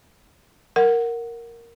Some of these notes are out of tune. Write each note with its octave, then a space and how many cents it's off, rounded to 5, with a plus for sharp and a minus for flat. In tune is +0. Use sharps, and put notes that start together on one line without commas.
A#4 +0 F#5 +0